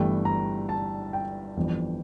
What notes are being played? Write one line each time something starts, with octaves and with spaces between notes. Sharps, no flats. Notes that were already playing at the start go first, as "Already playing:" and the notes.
Already playing: G1 G2 E3 A3 G5
A#5
A5
G5
G1 F2 E3